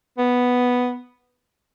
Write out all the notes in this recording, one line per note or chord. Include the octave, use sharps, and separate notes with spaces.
B3